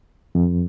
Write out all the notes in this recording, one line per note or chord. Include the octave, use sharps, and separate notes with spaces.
F2